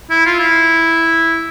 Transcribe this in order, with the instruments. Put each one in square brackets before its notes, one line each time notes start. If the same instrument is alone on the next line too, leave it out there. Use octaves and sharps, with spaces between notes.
[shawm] E4
F4
E4